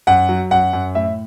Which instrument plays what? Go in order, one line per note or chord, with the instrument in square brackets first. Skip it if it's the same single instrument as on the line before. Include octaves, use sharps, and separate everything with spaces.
[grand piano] F#2 F#5
F#3
F#2 F#5
F#2
A2 E5